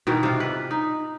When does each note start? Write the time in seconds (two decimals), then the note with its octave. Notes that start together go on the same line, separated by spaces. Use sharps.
0.07 B2 D#3 E3
0.23 C3 F4
0.40 B4
0.71 D#4